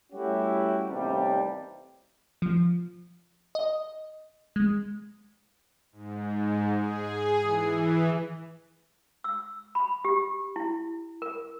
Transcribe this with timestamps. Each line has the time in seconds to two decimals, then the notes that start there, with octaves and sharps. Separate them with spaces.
0.12 G3 A3 C#4 E4 F#4 G4
0.88 A1 D#2 C3 G3
2.42 F3
3.55 D#5
4.56 G#3
5.92 G#2
6.75 G#4
7.41 E3
9.24 E6
9.75 B5
10.05 G4
10.56 E4
11.22 A#4